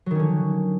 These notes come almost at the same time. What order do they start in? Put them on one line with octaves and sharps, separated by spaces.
F#3 D#3 C#4 D3